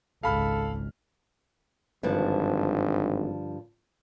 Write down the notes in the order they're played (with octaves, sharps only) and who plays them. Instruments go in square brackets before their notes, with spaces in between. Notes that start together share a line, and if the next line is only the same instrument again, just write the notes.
[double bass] G#1 C#2 [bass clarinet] A4 [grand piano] F5 B5 F6
[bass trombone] G#1 [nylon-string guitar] G2 D3 F3